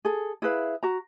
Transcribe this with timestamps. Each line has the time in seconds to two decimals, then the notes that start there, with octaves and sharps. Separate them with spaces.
0.05 G#4 A4
0.42 E4 G#4 B4 F5
0.83 F#4 A#5